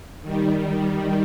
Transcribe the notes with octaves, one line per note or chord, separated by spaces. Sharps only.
D#3 G3